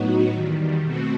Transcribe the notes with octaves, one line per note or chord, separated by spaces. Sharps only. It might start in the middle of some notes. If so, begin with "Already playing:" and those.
Already playing: A2 F#3 B3 D#4 F#4
E2 D#3 G3
B2 A3 C4 F#4